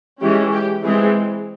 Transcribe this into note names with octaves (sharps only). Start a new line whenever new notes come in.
E3 G#3 C#4 G4
G4
E3 G#3 C4 G#4